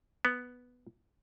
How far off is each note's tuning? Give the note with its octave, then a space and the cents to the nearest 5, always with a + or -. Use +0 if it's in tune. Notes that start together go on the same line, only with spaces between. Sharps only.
B3 +0